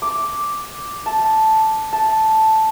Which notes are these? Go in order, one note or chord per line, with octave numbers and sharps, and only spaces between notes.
D6
A5
A5